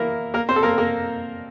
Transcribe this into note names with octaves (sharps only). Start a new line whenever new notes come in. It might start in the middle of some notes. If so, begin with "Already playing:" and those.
Already playing: E3 A#3 E4 A#4
A#3 A#4
C4 C5
A4
A#3 A#4
A#3 A#4